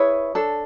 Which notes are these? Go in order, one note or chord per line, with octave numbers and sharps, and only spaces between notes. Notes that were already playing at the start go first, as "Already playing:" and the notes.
Already playing: E4 G#4 B4 C#5
D4 A4